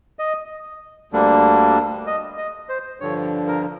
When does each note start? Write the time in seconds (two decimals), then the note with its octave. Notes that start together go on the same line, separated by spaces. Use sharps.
0.19 D#5
1.12 D2 D3 G3 A#3 D4
2.07 D#5
2.38 D#5
2.69 C5
3.00 G2 D3 F3 C#5
3.48 A#4